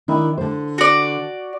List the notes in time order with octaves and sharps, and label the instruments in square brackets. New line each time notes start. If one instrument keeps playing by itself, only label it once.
[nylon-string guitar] D#3 D4 E4
D3 C5
[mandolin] F#4 D5